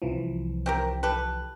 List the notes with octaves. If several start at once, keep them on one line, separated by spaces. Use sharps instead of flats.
C2 E3 F3
C4 G4 A#4
G4 A4 B4